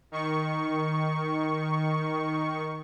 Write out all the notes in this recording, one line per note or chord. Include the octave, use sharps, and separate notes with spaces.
D#3 C#6